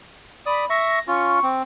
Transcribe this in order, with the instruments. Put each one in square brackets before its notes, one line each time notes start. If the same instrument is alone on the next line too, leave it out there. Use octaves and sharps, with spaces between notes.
[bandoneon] D5 D#6 [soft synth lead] B5
[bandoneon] E5 C#6 [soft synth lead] A#6
[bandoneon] C#4 F4 [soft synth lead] C#6
[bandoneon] C4